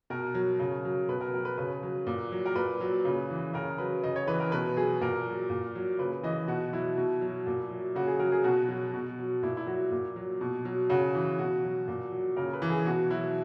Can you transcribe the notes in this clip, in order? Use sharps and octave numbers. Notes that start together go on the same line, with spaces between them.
B2 A#4
F#3
C#3
F#3
B2 B4
A#4
F#3 A#4
B4
C#3 B4
F#3
A#2
F#3
A#4
A#2 B4
F#3
C#3
E3
C#3 A#4
F#3 B4
C#3 D#5
C#5
E3 B4
A#4
B2 B4
F#3 G#4
A#2 A#4
F#3
A#2
F#3
C#3 B4
E3 D#5
B2 F#4
F#3 E4
B2
F#3
A#2
F#3
C#3 F#4
G#4
F#3 A#4
G#4
B2 F#4
F#3
B2
F#3
A#2 E4
E4
F#3 F#4
A#2
F#3
B2
F#3
C#3 F#4
E3
B2 F#4
F#3
A#2
F#3
C#3 A#4
B4
E3
G#4
B2 F#4
F#3 E4